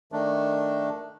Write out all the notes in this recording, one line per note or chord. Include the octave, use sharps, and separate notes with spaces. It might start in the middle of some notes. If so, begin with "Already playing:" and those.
D#3 A3 D4